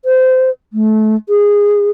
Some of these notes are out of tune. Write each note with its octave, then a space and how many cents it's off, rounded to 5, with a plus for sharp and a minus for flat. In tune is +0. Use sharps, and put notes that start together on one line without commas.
C5 -20
A3 -25
G#4 -15